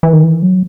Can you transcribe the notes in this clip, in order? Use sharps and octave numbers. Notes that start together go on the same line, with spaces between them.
E3
D#3
E3
F#3